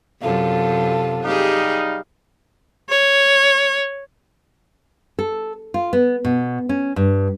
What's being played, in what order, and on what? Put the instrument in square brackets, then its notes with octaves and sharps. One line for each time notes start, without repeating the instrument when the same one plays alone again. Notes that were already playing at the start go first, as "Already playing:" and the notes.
[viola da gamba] F#2 C3 [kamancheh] F4 A4
[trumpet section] G3 D#4 F5 [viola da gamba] G4 G#4
[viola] C#5
[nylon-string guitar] A4
F4
B3
B2
C#4
G2